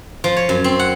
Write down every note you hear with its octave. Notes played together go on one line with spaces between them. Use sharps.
F3
C#5
F#2
C4
F#5